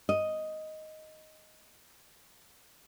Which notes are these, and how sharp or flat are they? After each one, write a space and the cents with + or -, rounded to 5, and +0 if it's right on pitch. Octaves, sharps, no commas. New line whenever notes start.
D#5 +5